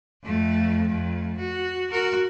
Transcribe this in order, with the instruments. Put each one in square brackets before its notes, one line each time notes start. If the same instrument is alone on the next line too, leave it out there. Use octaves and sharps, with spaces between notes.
[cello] F2 A3
F2 A3
F#4
F#4 A#4